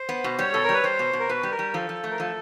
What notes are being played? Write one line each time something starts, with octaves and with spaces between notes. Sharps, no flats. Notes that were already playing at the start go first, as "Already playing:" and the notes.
Already playing: C5
B3
B2
G3 C#5
B2 A4
A#4
G3 B4
G3 C5
B2
B2
A#4
B2 B4
G3
A#4
G3
F3 A4
F3
A3
A#4
F3 A4